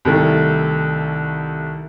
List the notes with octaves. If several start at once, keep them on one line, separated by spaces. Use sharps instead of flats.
C2 D#3 A3